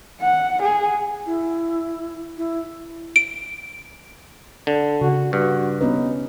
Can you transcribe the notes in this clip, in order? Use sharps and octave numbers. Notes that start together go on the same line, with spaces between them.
F#5
G#4
E4
E4
D7
D3
C#3 F#4
G2 F#4
B3 C#4 D#4 B4